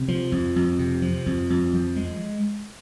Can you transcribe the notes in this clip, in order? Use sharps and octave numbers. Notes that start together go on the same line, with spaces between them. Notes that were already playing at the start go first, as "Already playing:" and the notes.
Already playing: C3
F3
F2
F2
C3
F3
F2
F2
F3
G#3